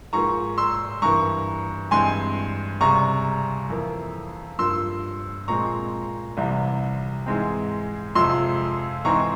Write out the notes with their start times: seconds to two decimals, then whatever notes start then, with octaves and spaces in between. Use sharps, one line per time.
0.13 G#2 F3 A#3 A#5 C#6
0.58 C6 E6
1.02 G2 E3 A#3 A#5 C#6
1.91 G2 E3 G#3 C4 G#5 C6
2.80 C#2 C3 G3 A#5 C#6
3.70 F2 E3 A#3
4.59 G2 F3 A#3 C6 E6
5.48 A#2 F3 G#3 C4 A#5 C#6
6.37 C2 C3 E3 G3
7.26 G#2 E3 G#3 C4
8.15 F2 C3 F3 G#3 C6 E6
9.05 G#2 E3 G#3 C4 A#5 C#6